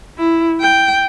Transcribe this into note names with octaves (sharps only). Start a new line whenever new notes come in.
E4
G5